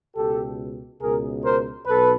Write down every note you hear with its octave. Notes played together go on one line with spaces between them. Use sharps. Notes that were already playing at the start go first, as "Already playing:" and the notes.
C#2 B2 G4 A4
C#2 B2 G#4 A#4
A#4 C5
B1 B2 A4 B4